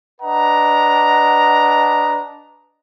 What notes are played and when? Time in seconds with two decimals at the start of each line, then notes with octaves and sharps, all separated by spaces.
0.21 D4 B4 D#5 F#5 A#5